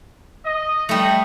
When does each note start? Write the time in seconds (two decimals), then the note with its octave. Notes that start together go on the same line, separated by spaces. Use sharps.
0.45 D#5
0.89 G3 A3